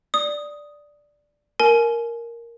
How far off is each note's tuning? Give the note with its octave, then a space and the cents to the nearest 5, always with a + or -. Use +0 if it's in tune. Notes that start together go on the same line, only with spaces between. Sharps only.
D5 +0 D#6 +0
A#4 +0 G#5 +35